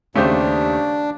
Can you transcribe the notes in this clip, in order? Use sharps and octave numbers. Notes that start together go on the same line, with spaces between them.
D#2 C#3 A3 D4 G4 C5